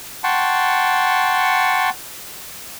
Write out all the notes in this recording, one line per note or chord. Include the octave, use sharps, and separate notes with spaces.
F#5 G5 A5 C6 C#6